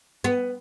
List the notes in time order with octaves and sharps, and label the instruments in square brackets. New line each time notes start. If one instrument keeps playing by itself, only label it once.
[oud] B3